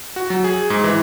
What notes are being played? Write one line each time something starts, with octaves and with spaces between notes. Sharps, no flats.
F#4
F#3
G#4
G#2
E3